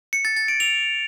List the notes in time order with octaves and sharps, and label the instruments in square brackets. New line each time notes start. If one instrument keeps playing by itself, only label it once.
[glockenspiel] C#7
A6
A6
D7
F7